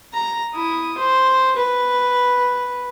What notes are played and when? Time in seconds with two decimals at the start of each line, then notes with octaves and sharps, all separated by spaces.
0.13 A#5
0.54 E4 D#6
0.98 C5
1.56 B4